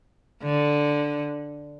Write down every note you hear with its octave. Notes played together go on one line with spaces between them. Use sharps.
D3